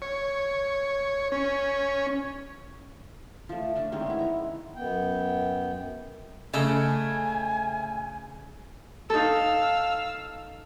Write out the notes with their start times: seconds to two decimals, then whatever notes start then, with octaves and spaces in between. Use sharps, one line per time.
0.02 C#5
1.32 C#4
3.49 F3 A3
3.75 A3 C#4 D4
3.92 D#3 G#3 C4 C#4
4.06 B3 E4
4.19 C#5 A#5
4.75 F#2 B3 G5
6.54 C#3 A3 D#5 E5 G#5
9.10 D#4 A4 F5 E6